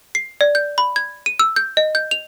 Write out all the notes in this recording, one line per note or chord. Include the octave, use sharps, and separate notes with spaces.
C7
D5
G6
B5
G#6
D#7
E6
G6
D#5
G6
F7